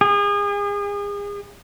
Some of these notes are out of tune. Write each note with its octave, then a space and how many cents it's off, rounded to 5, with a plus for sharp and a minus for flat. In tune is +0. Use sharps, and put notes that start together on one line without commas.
G#4 -35